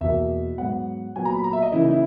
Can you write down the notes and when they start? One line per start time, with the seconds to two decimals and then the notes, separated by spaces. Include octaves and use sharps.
0.01 E2 B2 A#3 E5
0.58 G#2 F#3 B3 F#5
1.16 A#2 F#3 B3 G#5
1.25 A#5
1.34 B5
1.44 A#5
1.53 E5
1.62 D#5
1.72 C#3 E3 A#3 E4
1.82 D#4
1.91 E4